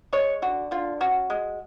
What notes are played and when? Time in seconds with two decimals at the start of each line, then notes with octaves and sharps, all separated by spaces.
0.13 G#3 C#5
0.42 D3 F#4
0.71 D3 F4
1.00 C#4 F#4
1.30 G#3